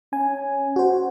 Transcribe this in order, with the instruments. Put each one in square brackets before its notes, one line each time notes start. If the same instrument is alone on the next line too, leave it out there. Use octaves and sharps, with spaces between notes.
[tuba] C#4 [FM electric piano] G#5
[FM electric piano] F#4 C5